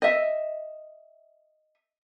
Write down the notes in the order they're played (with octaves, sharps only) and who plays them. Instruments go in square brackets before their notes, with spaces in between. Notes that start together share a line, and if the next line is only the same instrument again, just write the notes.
[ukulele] D#5 E5